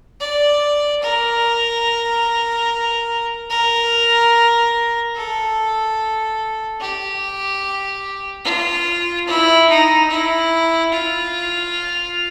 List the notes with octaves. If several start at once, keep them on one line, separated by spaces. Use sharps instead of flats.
D5
A#4
A#4
A4
G4
F4
E4
D#4
E4
F4